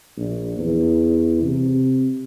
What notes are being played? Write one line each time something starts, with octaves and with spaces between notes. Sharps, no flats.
A#1
E2
C3